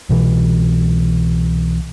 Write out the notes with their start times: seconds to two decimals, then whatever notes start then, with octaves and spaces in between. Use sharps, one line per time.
0.09 C2 B2 E3